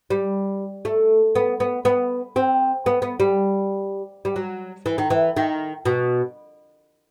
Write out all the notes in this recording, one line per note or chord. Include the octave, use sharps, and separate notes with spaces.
G3
A3
B3
B3
B3
C4
B3
B3
G3
G3
F#3
E3
D#3
E3
D#3
B2